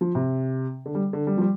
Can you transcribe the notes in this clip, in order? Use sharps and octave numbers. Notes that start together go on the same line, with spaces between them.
F3
C3
D3
G3
D3
G3
F3
G3